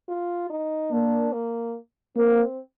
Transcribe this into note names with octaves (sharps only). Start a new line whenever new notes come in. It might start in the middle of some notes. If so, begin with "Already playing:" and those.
F4
D#4
A#3 D4
A#3
A#3 C4